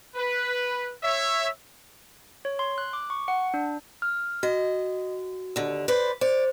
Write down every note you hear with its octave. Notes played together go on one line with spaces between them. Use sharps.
B4
C#5 E5
C#5
C6
F#6
D6
C#6
F#5
D4
F6
F#4 D#5
D#2 D3
B4 C5 D5
C5 D5